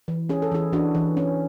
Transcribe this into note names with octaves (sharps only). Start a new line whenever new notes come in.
E3
C#4 G#4
A4
E3 E4 G#4
E3 D4 F#4
E3
C#4